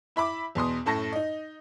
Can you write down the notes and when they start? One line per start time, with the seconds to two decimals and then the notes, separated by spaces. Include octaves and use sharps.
0.16 E4 E5 B5 D6
0.55 E2 B2 C6 D#6
0.86 F#2 A2 A5 C#6 A#6
1.12 D#4 D#5